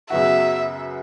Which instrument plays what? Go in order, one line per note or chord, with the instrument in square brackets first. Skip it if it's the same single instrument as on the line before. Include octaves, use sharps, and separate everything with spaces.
[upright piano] F#2 C#3 F#3 B3 F#4 [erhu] E5